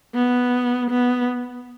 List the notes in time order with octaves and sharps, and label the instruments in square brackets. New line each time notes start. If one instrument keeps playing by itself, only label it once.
[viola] B3
B3